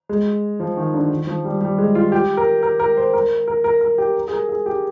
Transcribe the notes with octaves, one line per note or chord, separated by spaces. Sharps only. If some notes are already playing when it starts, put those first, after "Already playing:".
G#3
F3
D#3
D3
D#3
F3
G3
G3
G#3
F4
G4
A#4
A#4
A#4
C5
A#4
A#4
A#4
A#4
G4
G#4
A#4
G#4
G4